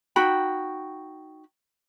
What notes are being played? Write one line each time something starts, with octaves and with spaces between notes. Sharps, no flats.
D#4 F#4 G5 B5